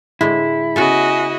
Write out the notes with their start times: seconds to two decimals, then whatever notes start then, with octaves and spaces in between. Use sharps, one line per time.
0.21 A2 D3 G#3 E4
0.76 C#3 B3 F#4 A4 D#5 G#5